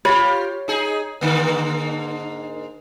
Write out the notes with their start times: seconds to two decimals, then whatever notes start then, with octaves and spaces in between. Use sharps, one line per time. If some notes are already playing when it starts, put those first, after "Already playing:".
0.05 F4 G4 C#5 B5
0.68 D#4 G#4
1.21 G#2 D3 A#3